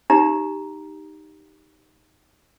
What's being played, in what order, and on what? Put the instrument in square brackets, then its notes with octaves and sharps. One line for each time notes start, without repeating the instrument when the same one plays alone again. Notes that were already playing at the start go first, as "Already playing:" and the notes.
[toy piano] D#4 G4 A#5